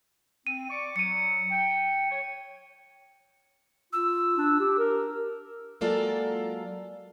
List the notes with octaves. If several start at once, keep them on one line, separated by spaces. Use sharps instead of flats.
C4 D#7
D5 C#6 D6
F#3 C#7 D#7
G5
C#5
F4 E6
D4
G4
A#4
F#3 G#3 A#3 F4 A4 D5